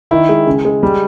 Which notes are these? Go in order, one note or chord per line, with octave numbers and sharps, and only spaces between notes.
D#3 E4
G#3
C#3
G#3
G3